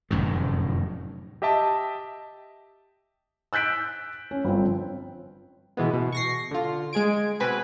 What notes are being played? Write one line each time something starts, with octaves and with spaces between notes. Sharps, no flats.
F1 F#2 A2 D#3
G4 D#5 E5 G5 A5
E6 F#6 G6 B6 D7
C#4
G1 F3 C4
B2 E3 G#3 B3
B2
C#6 A#6 C7
D3 F4
G#3 G#4 G#6 D7
B2 C4 B4 G#5